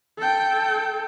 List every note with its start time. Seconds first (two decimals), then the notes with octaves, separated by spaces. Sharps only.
0.18 A4 G5